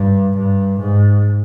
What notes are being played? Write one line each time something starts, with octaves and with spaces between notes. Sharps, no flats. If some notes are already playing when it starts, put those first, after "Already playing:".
Already playing: G2
G2
G#2